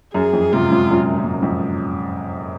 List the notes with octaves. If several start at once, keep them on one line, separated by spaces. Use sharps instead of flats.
F#2 G#4
F2
G#2 C3 F4
G#2 C3
F#2 A#2
F#2
G#2
F#2
F2 G#2